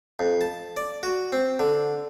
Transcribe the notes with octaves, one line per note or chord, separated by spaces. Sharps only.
F2
A5
D5
F#4
C4
D3